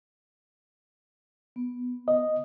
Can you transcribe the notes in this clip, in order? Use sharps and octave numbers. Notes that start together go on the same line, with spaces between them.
B3
D#5